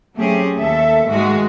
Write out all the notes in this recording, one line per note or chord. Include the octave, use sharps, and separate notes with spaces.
F#3 A3 C4 C#4 G4 G#4
D#2 A4 E5
G#2 D#3 G#3 A3 F#4